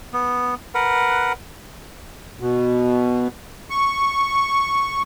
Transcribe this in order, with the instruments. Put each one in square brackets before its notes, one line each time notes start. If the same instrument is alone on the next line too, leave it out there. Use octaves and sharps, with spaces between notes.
[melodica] B3
A#4 B4 F#5
[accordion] B2
C#6